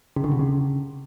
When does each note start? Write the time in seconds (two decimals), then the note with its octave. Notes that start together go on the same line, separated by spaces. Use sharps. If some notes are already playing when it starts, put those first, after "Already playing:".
0.16 C#3
0.24 D3
0.32 C3
0.39 C#3